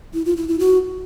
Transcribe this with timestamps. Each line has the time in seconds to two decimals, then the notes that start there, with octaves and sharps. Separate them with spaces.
0.14 E4
0.25 F4
0.37 E4
0.48 E4
0.59 F#4